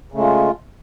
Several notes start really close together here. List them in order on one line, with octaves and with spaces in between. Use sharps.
C#3 A3 G#3 F4